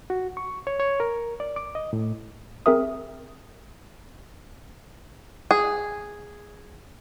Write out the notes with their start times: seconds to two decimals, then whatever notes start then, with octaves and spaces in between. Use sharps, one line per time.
0.10 F#4
0.37 C#6
0.67 C#5
0.80 C#5
1.00 A#4
1.40 D5
1.56 D6
1.75 D#5
1.93 A2
2.66 C4 G#4 A#4 E5 D#6
5.51 G#4